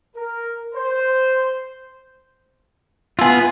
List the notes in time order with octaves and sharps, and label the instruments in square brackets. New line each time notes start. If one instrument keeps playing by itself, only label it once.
[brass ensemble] A#4
C5
[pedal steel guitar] B3 F4 [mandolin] E4 G#4